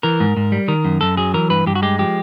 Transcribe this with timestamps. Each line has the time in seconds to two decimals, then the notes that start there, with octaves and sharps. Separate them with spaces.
0.03 E3 A#4
0.20 G#2
0.37 G#2
0.52 G3
0.68 D#3 A#4
0.85 F#2
1.01 F#2 A4
1.17 F#3 G#4
1.34 E3 A#4
1.50 G2 B4
1.66 G2 G4
1.75 F#4
1.82 G#3 G4
1.99 F3 G4